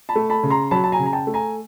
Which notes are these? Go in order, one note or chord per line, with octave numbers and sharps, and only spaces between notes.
A5 B5
A3
A5 B5
C#3
A#5 C6
F#3 A5 B5
A5
G#5 A#5
C#3
A#5
G5 A5
A3
G#5 A#5